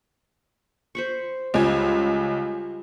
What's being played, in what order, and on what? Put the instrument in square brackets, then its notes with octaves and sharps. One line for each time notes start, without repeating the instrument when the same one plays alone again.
[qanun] C5 B5 C#6
[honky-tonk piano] C#2 G#5 [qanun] G3 F4